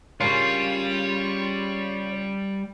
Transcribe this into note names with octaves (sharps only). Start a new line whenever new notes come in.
C#3 G3 C#4 F4 A#4 C#5